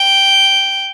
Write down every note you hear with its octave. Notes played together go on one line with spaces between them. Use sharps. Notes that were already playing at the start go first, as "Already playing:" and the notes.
Already playing: G5